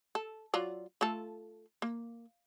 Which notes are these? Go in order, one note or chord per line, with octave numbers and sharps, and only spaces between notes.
A4
F#3 F4 D5
A3 F4 A4
A#3